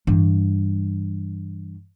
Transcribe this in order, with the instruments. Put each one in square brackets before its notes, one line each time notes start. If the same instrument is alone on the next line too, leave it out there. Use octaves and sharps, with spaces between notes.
[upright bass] G2 E3